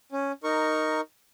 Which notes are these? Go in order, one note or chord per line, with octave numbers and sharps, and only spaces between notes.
C#4
D#4 A#4 C#6